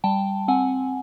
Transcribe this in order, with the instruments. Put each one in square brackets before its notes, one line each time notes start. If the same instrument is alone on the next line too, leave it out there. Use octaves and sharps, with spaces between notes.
[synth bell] G3 G5 A5
C4 F#5 G#5